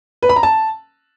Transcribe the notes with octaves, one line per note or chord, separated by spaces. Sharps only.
B4
B5
A#5
A5